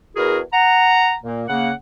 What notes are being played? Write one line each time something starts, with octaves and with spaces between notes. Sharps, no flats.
E2 E4 F#4 G#4 A#4
F#5 A#5
A#2 A#3
C#3 A#3 F#5